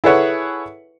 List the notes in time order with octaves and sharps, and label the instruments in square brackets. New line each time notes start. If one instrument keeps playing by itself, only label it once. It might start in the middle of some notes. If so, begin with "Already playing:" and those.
[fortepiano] E4 G#4 A4 B4 C#5 F#5